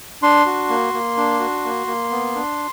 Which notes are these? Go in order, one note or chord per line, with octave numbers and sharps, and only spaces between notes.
D4 C6
F#4
A#3
A#3
D4
F#4
A#3
A#3
B3
D4